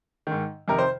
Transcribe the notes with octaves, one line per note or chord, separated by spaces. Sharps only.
G#2 D#3
F2 C3 D#3 A#4
C5